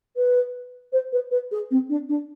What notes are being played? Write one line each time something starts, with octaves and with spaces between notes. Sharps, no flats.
B4
C5
B4
B4
G#4
C4
D4
D4